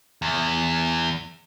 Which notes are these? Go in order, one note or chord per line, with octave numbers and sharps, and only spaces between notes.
E2